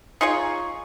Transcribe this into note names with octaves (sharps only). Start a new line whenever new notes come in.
D#4 F4 G#4 C#5